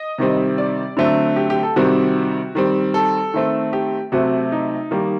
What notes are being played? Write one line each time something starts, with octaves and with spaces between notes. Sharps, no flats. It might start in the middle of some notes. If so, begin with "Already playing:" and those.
Already playing: D#5
C3 D#3 G3 C4
D5
D3 F#3 A3 C4
G4
G4
A4
C3 D#3 G3 C4 F#4
D#3 G3 C4
A4
D#3 A3 C4
G4
C3 F#3 A3 C4 F#4
D#4
D#3 G3 A#3